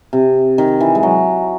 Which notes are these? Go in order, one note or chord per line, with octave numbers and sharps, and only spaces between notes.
C3
D#3
E3
G#3
F#3